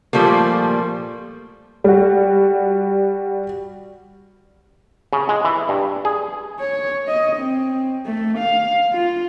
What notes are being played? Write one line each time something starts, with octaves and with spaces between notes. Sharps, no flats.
A#2 F3 G3 A3 A#3
G3 F#4
C#3
G#3
E3
G2
G#4
C#5
D#5
C4
A3
F5
F4